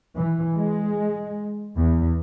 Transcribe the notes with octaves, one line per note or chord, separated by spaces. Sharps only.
E3
G#3
E2